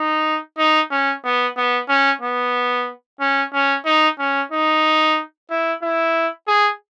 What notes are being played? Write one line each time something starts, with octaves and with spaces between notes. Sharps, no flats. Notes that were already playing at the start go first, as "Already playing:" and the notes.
Already playing: D#4
D#4
C#4
B3
B3
C#4
B3
C#4
C#4
D#4
C#4
D#4
E4
E4
G#4